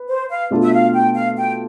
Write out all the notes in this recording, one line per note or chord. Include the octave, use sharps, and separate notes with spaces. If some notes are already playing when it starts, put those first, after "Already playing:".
Already playing: B4
C5
F5
B2 A3 D4 F4 A4
E5
F5
G5
F5
G5